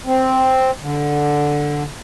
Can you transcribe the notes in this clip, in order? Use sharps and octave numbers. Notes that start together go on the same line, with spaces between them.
C4
D3